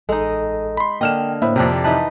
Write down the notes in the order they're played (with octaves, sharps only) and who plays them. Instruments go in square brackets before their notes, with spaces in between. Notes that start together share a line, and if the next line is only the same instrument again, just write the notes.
[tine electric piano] A1 A4 [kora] G#3 D#4
[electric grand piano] B5 C6
[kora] D3 D#5 [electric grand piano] A#3 F6 E7 [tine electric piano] G5
[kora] A2 [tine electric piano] A#3 C5 [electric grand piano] E5 B5
[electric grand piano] F2 C3 [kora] D4 G4 A#4
[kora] E3 D#4 B4 [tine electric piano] A5